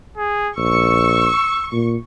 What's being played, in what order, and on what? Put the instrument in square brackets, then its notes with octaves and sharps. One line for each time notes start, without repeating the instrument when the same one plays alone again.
[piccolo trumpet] G#4
[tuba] A#1 [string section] C#6 [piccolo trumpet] E6
[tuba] A#2